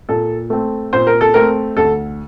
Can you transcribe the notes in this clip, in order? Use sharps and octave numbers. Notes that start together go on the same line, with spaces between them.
A#2 A4
A3 C4
A#2 C5
A#4
A4
A3 C4 A#4
D2 A4